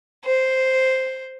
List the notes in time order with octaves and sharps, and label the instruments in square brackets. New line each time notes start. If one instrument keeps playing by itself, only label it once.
[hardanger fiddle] C5